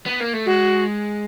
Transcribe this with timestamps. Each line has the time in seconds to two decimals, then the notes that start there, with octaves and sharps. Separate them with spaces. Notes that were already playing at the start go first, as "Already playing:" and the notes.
0.06 B3
0.20 A#3
0.33 A3
0.46 G#3 F#4